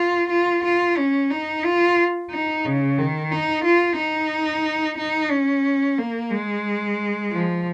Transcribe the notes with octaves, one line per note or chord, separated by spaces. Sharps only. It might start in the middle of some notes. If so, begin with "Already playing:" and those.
Already playing: F4
F4
F4
C#4
D#4
F4
D#4
C#3
D#3
D#4
F4
D#4
D#4
C#4
A#3
G#3
F3